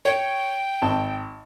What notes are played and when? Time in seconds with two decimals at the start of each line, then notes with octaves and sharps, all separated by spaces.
0.05 C#5 G5
0.82 G#1 A5